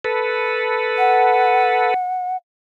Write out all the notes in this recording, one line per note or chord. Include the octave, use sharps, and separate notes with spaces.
A4 B4
F#5